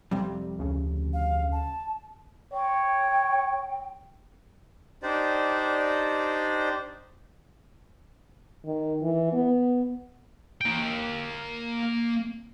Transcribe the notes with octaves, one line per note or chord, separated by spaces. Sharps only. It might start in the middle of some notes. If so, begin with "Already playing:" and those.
F2 C3 G3
D2 C#3
F5
A5
C#5 G5
D4 D#4 G4 C5 D5
D#3
E3
B3
A#3 G5